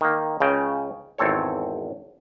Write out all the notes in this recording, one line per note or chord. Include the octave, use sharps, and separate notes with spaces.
D#3 A#3
C#2 C#3 G5
G#1 E2 C4 A4 C#5